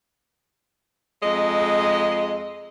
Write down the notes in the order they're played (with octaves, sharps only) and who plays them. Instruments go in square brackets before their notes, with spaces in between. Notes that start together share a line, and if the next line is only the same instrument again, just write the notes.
[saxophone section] F2 G#3 D#5